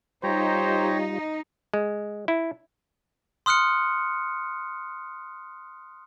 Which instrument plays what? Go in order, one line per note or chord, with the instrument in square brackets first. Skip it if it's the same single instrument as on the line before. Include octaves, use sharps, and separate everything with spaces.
[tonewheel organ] G3 F4 [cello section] D#4 [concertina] G4 C#5 A#5 [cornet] C5
[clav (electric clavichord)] G#3
E4
[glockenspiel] C6 D#6 F6 F#6 C#7